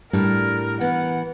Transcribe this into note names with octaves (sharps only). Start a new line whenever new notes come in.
A2 G3 D4 A#4
E3 B3 F#5